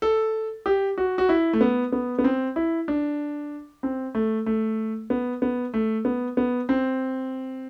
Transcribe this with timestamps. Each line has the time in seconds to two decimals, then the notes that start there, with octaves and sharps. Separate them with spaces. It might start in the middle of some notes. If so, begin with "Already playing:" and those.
0.02 A4
0.66 G4
0.98 F#4
1.18 F#4
1.29 E4
1.53 A3
1.61 B3
1.92 B3
2.19 B3
2.24 C4
2.56 E4
2.88 D4
3.83 C4
4.15 A3
4.46 A3
5.10 B3
5.42 B3
5.74 A3
6.05 B3
6.37 B3
6.69 C4